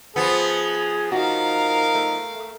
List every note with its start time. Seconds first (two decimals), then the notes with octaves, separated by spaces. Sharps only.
0.16 F3 B3 G#4
1.12 D#4 F#4 A#4 F5
1.95 A3